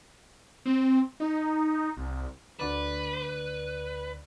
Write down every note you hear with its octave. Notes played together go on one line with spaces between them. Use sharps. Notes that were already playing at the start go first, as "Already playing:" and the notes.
C4
D#4
C2
D2 D3 B4 D5